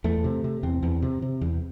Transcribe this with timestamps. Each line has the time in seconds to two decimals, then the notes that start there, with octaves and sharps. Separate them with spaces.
0.04 E2 A3
0.24 C3
0.44 C3
0.63 E2 C4
0.82 E2
1.02 C3
1.22 C3
1.41 E2